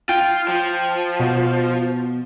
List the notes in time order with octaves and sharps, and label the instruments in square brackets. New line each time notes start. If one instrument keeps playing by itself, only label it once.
[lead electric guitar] F4 [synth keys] G5
[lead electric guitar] F3
[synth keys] B2